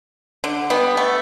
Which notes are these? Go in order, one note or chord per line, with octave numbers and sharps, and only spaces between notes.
D3
G3 B3
A3